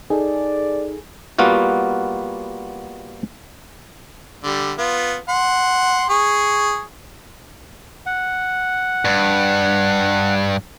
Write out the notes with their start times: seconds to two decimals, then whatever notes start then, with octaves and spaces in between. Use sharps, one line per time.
0.10 D#4 G#4 A4 D5
1.38 G3 A#3 B3 F4 F#4
4.44 D3 G3
4.78 B3 F4
5.29 F#5 C6
6.10 G#4 C#6
8.06 F#5
9.05 G2